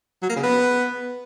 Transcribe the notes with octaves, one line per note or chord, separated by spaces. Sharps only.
F#3
A#3
C#3
B3